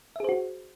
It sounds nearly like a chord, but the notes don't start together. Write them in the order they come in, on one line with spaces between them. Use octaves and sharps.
E5 G#4 C5 F#4